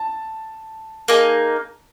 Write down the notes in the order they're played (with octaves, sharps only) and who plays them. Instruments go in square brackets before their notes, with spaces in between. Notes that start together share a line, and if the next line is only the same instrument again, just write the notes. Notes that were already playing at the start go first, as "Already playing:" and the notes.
Already playing: [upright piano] A5
[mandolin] A#3 D#4 G#4